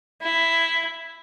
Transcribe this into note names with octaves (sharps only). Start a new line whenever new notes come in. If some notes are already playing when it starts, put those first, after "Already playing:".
E4